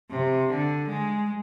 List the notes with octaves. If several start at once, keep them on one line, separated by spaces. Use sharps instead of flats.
C3
D3
G#3